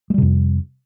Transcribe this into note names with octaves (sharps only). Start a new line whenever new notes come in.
F2 C3 G3 G#3